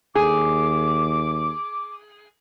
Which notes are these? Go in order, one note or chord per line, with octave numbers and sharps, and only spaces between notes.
D#2 G#4 D6